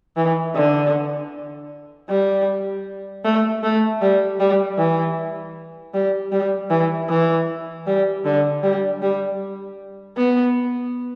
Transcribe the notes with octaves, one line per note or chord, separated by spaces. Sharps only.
E3
D3
G3
A3
A3
G3
G3
E3
G3
G3
E3
E3
G3
D3
G3
G3
B3